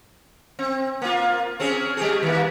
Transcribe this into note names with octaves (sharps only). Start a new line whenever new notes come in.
C4
A#3 F4
C4 C#4 G#4
G3 G4 G#4
D#3 A#3